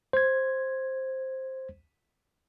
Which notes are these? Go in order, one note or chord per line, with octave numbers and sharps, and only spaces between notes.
C5 G#6